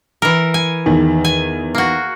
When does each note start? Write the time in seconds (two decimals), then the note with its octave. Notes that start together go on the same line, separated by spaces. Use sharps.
0.22 E3 A#4
0.54 G#5
0.86 E2 D#3
1.25 G#5
1.75 A#3 F#4